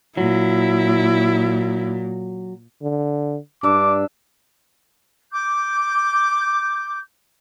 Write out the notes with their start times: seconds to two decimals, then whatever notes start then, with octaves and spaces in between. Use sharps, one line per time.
0.17 A#2 F#3 E4
2.82 D3
3.63 G2 D4 E5 D6
5.32 D6 G6